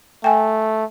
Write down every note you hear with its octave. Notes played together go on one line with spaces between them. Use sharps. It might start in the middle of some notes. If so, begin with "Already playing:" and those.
A3 G5 G#5